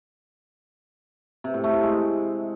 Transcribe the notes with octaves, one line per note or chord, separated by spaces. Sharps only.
C3
A2
A3
A2
G#3